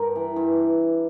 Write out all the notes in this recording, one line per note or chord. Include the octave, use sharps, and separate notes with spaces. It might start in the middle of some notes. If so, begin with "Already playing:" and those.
Already playing: G2 A#4
E3
G2